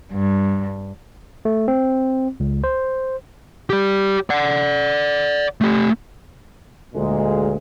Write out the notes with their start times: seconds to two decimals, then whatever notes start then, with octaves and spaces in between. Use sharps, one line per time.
0.13 G2
1.45 A3
1.68 C4
2.40 C#2
2.64 C5
3.70 G4 D5
4.30 D5 F#5
5.61 A3 G4
6.94 D2 A#2 G#3